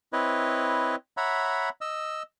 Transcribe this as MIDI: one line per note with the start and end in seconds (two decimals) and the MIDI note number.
0.13 0.96 60
0.13 0.96 64
0.13 0.96 71
0.13 0.96 73
0.13 0.96 75
1.17 1.69 73
1.17 1.69 76
1.17 1.69 78
1.17 1.69 82
1.17 1.69 83
1.81 2.23 75
1.81 2.23 88